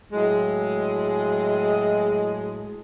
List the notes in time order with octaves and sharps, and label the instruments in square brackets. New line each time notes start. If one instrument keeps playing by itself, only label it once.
[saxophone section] A2 F#3 G#3